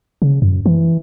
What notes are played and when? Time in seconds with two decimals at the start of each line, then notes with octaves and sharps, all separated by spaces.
0.22 C#3
0.42 F#2
0.66 E3